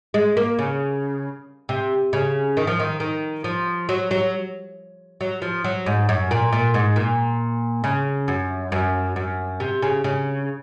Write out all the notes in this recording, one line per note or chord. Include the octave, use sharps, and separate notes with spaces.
G#3
A#3
C#3
C3
C#3
D#3
F3
D#3
D#3
F3
F#3
F#3
F#3
F3
F#3
G#2
F#2
A#2
A#2
G#2
A#2
C#3
F#2
F#2
F#2
C3
C#3
C#3